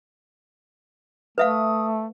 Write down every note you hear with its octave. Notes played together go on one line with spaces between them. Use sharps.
A3 B4 E5 F5 D#6